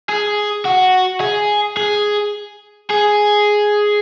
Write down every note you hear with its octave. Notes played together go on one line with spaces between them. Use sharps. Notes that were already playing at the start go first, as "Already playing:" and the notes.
G#4
F#4
G#4
G#4
G#4